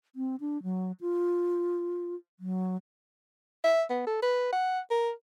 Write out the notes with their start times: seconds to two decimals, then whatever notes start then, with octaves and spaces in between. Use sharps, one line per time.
0.16 C4
0.40 D4
0.63 F#3
1.01 F4
2.40 F#3
3.64 E5
3.90 B3
4.07 A4
4.22 B4
4.53 F#5
4.91 A#4